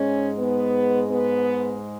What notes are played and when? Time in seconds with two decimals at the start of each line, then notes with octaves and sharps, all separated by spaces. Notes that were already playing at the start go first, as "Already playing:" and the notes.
Already playing: G#2 G#3 C#4
0.37 B3
1.10 B3